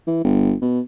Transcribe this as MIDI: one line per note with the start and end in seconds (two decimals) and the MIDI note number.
0.07 0.24 52
0.24 0.54 31
0.62 0.80 47